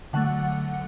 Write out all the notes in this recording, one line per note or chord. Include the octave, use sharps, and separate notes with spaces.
D3 F#3 A3 F#5